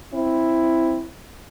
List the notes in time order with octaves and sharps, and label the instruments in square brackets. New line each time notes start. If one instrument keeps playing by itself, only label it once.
[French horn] C4 [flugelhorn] E4